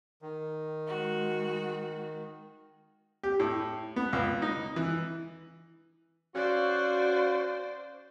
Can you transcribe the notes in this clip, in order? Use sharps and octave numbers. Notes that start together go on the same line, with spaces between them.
D#3
G#3 F#4
G4
A2
B3
C#2
D#4
E3
C#4 F#4 C5 D5 F5